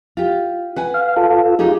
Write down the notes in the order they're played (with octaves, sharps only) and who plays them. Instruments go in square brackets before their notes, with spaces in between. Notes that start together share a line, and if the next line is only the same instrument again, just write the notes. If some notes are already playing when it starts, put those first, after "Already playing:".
[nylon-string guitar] F4 G4
B4 F#5 G#5
[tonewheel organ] F5
F4 A4
[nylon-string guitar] D#4 G4 G#4 [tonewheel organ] F4